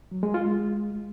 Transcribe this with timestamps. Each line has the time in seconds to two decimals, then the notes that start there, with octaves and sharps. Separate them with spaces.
0.11 F#3
0.23 G#3
0.34 F4
0.46 G#3